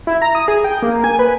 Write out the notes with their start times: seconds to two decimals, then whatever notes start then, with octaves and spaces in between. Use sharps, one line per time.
0.07 E4
0.22 A#5
0.35 D#6
0.48 G#4
0.64 G5
0.82 A#3
1.04 G#5
1.19 B4